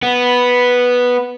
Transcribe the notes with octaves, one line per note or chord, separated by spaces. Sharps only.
B3